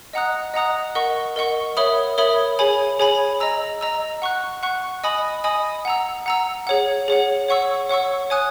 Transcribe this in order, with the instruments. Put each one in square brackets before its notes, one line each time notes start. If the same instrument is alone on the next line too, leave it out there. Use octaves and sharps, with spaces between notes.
[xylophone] D#5 F#5 A#5 D#6 F#6
D#5 F#5 A#5 D#6 F#6
A#4 D#5 F#5 C#6
A#4 D#5 F#5 C#6
A#4 C#5 E5 B5 D#6
A#4 C#5 E5 B5 D#6
G#4 C#5 G#5 B5
G#4 C#5 G#5 B5
D#5 A#5 E6
D#5 A#5 E6
F#5 C#6 F#6
F#5 C#6 F#6
D#5 G#5 B5 D#6
D#5 G#5 B5 D#6
F#5 A#5 E6
F#5 A#5 E6
G#4 C#5 F#5
G#4 C#5 F#5
C#5 F#5 C#6 E6
C#5 F#5 C#6 E6
C#5 G#5 D#6 F#6